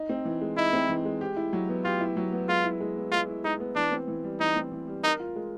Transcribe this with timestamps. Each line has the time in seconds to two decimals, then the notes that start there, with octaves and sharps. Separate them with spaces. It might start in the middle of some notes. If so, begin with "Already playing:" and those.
Already playing: D#4
0.09 C4
0.25 E3
0.41 G#3
0.57 D#4 E4
0.73 C4
0.89 E3
1.05 G#3
1.21 G4
1.36 E4
1.53 F#3
1.69 B3
1.84 F4 G4
2.01 E4
2.17 F#3
2.33 B3
2.49 G#3 F4
2.64 E4
2.80 G#3
2.97 B3
3.12 G#3 F4
3.29 E4
3.44 G#3 D#4
3.60 B3
3.75 E3 D4
3.92 C4
4.08 E3
4.24 G3
4.40 E3 D#4
4.56 C4
4.72 E3
4.87 G3
5.04 D#4 A#4
5.20 F4
5.36 G#3